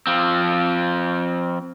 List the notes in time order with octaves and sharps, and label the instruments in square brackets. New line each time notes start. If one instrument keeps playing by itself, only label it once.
[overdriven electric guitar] F3 C4